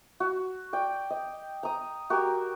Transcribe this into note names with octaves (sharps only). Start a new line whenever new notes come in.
F#4
D5 G5
D#5
A#5 D#6
F#4 G4 A#4